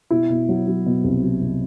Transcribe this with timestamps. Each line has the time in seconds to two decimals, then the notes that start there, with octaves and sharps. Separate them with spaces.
0.10 B2 E4
0.30 B2
0.49 F#3
0.68 F#3
0.86 B2
1.04 C2
1.22 F#3
1.41 C2